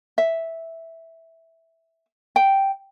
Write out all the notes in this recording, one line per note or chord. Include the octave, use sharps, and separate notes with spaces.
E5
G5